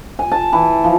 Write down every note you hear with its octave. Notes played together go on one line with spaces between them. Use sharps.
G#5
A5
E3
F3